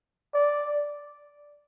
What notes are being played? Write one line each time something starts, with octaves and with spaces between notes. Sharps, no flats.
D5